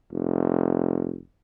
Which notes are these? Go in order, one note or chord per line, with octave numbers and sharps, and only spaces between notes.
F1